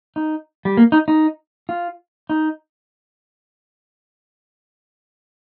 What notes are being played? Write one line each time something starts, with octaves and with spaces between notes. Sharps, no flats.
D#4
G3
A#3
D#4
D#4
F4
D#4